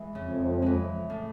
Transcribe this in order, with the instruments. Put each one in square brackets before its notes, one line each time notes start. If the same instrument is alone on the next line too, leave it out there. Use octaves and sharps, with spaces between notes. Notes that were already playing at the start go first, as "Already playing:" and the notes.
Already playing: [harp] E3 G#3
[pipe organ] F2 [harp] C#3
[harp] E3 G#3
A2